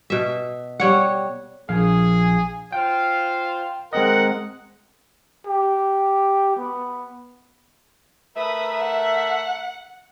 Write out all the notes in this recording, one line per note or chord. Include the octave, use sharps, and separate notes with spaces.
B2 E5
G3 C#5 F#5
A#1 G#4 F5
F4 C5 F5 G5
G#3 C4 A#4 D#5 F#5
G4
B3
A3 A#4 B4 E5 D#6
F#5